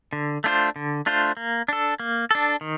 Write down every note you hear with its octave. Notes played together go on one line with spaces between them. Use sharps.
D3
A3 D4 F4 C5
D3
A3 D4 F4 C5
A#3
D4 A4
A#3
D4 A4
D#3